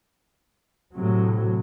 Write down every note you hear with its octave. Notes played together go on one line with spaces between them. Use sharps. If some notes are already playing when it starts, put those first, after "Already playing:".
A2 C3 F#3